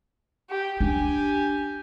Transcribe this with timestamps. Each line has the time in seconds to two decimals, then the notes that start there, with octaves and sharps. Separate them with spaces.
0.50 G4
0.81 D4 G4 G#5